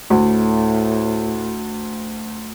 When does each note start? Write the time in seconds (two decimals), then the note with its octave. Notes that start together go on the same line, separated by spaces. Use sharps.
0.10 D2 A2